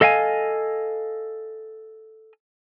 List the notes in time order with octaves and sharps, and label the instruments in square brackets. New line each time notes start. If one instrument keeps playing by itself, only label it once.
[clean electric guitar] A4 D#5 F5 G5 G#5